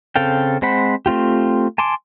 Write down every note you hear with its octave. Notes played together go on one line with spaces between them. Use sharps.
C#3 C4 A4 F5 G5
G#3 C4 C5 F#5 B5
A3 C4 F4 G4
G#5 A5 C6 D6